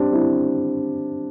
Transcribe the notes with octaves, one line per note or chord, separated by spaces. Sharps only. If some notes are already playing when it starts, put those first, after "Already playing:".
Already playing: C4 D4 G4
C4 E4